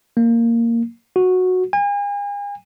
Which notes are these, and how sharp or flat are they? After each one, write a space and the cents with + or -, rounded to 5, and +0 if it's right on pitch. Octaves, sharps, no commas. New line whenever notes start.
A#3 -10
F#4 -10
G#5 -40